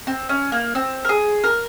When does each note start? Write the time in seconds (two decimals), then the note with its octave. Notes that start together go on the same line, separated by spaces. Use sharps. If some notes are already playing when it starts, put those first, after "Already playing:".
0.07 C4
0.29 C#4
0.52 A#3
0.75 C4
1.05 A#4
1.09 G#4
1.44 A#4